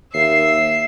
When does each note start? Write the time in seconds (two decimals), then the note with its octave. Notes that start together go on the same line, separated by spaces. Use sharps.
0.14 D#2 E5 C7